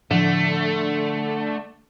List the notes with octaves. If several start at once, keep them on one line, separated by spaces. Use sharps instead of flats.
A2 D3 F3 A3